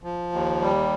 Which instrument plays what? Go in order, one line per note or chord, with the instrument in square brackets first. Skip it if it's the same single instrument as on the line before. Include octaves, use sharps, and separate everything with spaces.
[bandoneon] F3
D#2
G3